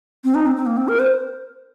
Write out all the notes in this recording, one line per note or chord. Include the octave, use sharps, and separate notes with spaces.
C4
D#4
C4
C4
A#3
C4
A#4
C5